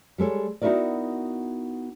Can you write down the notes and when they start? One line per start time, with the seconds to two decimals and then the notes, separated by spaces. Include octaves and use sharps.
0.18 G3 G#3 A4 C#5
0.62 B3 D#4 E4 F#4 A#4 D5